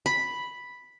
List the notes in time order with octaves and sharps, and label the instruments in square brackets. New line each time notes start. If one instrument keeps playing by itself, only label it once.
[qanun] B5